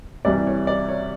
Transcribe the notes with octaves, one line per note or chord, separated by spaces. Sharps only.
C2 C3 E3 G3 D5
C#5
D5
C#5